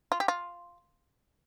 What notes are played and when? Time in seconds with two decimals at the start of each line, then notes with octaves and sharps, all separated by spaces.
0.12 F4
0.20 G4
0.28 F4